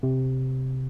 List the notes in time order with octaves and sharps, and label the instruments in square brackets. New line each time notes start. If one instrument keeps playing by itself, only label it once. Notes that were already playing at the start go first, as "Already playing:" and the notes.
[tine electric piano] C3